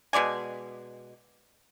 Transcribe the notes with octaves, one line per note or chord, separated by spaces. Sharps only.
B2 G#3 D5 G#5